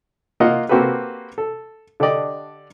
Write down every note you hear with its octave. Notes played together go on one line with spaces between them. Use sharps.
A#3 F4 D#5 F#5
A#3 C4 F#4 G4 A4 B4
A4
D3 D4 G4 D5 D#5